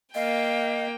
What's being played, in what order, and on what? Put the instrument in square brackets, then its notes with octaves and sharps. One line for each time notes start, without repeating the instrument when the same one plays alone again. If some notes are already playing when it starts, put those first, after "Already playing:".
[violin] A#3 G5 [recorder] D#5 [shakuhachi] F5